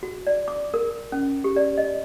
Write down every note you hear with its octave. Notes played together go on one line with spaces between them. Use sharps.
F#4
D5
D6
A#4
C#4
G4
D5
D#5